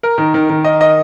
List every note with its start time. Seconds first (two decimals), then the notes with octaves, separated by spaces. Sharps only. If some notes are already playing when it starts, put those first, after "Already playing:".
0.03 A#4
0.18 D#3
0.34 D#3
0.49 D#3
0.64 D#5
0.81 D#5